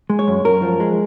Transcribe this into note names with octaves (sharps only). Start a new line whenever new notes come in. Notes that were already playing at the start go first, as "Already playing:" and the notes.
G#3
C#5
F#2
F#2 A#4
F3
G#3